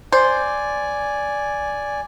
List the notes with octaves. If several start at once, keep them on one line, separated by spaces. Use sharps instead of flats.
C5 D5 G#5